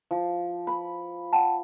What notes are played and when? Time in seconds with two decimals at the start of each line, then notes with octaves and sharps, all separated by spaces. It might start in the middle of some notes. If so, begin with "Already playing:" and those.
0.11 F3
0.67 B5
1.33 F#5 G5 A5